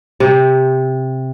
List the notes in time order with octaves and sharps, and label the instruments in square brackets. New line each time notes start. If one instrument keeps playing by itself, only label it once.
[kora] C3